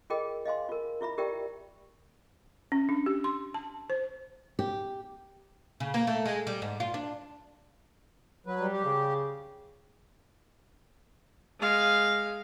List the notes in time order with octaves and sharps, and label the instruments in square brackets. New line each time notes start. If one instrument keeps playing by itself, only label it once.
[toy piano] F4 G#4 A#4 D#5 G5
D#5 F5 G#5 C6
F4 A#4
E4 F4 E5 B5
G4 A#4 D5 E5 G5
[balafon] C#4
D4
G4
C6
A5
C5
[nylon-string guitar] G4
[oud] C#3
A#3
A3
G#3
G3
G#2
F4
D4
[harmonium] F#3 B4
[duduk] G3
[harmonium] G4
[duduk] C#3
[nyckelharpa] G#3 F5